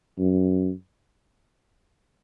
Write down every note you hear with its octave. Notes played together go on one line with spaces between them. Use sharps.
F#2